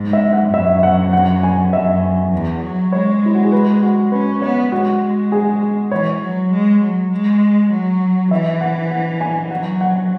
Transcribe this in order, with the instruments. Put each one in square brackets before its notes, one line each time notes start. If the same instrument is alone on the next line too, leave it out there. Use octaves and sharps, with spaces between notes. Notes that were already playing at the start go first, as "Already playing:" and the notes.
Already playing: [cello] G#2
[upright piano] E5
F#5
[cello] F#2 [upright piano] E5
[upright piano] E5
F#5
F#5
G#5
[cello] F#2 [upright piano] E5
[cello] E2
F#3
[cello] G#3 [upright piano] C#5
[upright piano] E4
F#4
G#4
B4
F#4
[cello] C#4 [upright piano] B4
[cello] B3 [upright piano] C#5
[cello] G#3 [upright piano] F#4
[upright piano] G#4
[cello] E3 [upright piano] C#5
[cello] F#3
G#3
F#3
G#3
F#3
[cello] E3 [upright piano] E5
[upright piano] F#5
F#5
G#5
[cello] F#3 [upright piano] F#5
[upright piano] F#5